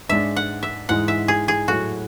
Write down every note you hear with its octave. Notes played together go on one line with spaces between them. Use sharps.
G#2 G#3 D4 E5
F#5
E5
G#2 E3 G#3 F#5
E5
G#4
G#4
A2 F#3 A3 F#4